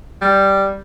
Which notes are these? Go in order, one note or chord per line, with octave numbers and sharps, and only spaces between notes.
G3